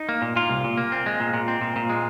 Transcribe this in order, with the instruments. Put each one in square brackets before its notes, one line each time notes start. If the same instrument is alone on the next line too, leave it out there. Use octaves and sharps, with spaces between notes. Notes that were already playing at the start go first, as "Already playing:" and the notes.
Already playing: [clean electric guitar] D#4
A#3
A#2
A#2 F4
C2
A#2
A#3
C4
G#3
A#2
A#2
C4
A#2
A#2
G#3